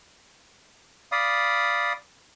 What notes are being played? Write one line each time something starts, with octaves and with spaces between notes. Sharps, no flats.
D5 F5 B5 D#6